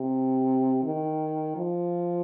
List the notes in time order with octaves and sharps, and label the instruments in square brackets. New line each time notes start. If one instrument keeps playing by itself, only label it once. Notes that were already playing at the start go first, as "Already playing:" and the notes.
Already playing: [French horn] C3
D#3
F3